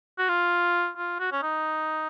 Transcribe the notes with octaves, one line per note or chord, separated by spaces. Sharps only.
F#4
F4
F4
F#4
C#4
D#4